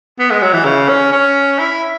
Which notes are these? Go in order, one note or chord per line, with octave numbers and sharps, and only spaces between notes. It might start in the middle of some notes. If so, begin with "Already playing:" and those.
B3
G#3
F#3
E3
C#3
C#4
C#4
E4